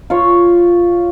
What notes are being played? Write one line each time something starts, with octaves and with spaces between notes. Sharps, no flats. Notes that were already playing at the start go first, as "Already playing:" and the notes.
F4 C#5